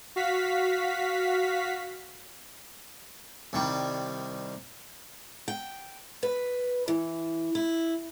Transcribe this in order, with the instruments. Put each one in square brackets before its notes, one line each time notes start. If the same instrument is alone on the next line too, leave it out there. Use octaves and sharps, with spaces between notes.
[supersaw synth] F#4 F5 B6
[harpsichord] C2 D#3 G3
[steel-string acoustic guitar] G5
B4
E3
E4